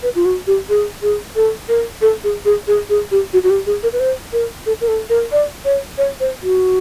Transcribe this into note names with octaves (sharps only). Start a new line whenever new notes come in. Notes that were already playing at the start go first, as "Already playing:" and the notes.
B4
F4
F#4
G4
G#4
G#4
A4
A#4
A4
G#4
G#4
G#4
G#4
G4
F#4
F#4
G4
G#4
A#4
B4
C5
A#4
A4
A#4
A4
A#4
D5
C#5
C#5
C5
F#4